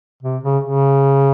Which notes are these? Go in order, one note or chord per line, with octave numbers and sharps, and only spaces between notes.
C3
C#3
C#3